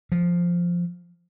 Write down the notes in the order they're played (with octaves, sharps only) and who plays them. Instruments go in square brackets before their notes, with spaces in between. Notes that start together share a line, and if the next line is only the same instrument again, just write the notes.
[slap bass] F3